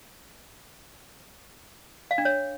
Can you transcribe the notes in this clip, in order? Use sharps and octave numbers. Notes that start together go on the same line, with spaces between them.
F5
D4
C#5